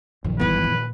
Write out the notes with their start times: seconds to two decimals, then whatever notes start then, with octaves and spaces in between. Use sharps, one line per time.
0.24 A#1 F#2 D#3 F3
0.40 G1 E3 B3 B4
0.64 A#2